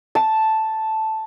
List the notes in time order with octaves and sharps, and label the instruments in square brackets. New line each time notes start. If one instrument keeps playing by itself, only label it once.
[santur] A5